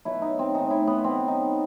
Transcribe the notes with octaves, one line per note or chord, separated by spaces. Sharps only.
B2 F#3 E4
D#4
C4
A2 E3 D#4
E4
B3
B2 F#3 C4
D#4